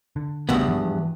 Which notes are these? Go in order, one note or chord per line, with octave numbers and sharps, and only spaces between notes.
D3
G#1 E2 G2 C#3 A3 B3
G#2 E3 F3